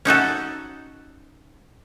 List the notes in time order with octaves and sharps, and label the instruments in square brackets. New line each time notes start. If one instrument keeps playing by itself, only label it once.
[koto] C#4 D#4 F#4 A4